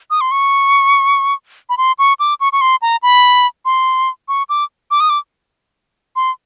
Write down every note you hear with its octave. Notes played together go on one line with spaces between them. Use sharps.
D#6
C6
C#6
B5
C6
C#6
D6
C#6
C#6
C6
A#5
B5
C6
C#6
D6
D6
D#6
D6
C6